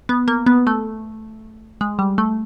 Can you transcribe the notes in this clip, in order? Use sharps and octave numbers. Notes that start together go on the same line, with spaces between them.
B3
A#3
B3
A3
G#3
G3
A3